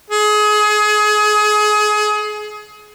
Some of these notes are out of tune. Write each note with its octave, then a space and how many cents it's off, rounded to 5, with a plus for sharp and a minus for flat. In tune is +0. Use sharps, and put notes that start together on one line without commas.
G#4 +25